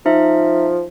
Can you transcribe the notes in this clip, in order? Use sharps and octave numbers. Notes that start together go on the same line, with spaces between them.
F3 D#4 E5